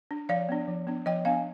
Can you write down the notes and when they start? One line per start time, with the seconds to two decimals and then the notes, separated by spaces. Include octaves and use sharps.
0.11 D4
0.29 F3 D5 F5
0.49 B3 D4
0.68 F3
0.87 B3 D4
1.06 F3 D#5 G5
1.25 B3 D4 F5 G#5